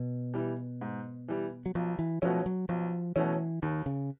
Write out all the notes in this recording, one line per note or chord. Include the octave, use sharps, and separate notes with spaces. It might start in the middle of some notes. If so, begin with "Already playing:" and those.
Already playing: B2
E3 G3
G#2
E3 G3
F#3
B1 F3
E3
B2 F3 F#3 A3 C#4
F#3
B1 F3
B2 E3 F#3 A3 C#4
D#2 D#3
C#3